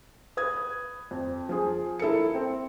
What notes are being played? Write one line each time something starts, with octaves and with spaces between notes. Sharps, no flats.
B4 D#6 G#6
F2
F3 G#4
E4 A4 A#4 C#7
C4